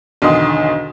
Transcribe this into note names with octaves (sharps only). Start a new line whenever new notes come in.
B1 E2 D3 D#3 C6 D#6